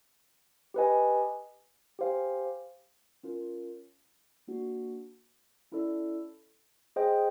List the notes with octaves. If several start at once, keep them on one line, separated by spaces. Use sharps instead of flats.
G4 B4 D#5 G#5
G4 C5 F5 G#5
C#4 F4 A#4
A#3 D4 F#4
C#4 E4 A4 D5
G#4 C5 D#5 G5